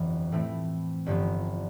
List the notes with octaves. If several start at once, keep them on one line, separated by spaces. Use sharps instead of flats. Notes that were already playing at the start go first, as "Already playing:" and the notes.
Already playing: G1 F2 E3 B3
A2 E3 A3 C4 E4
G1 G2 F3 B3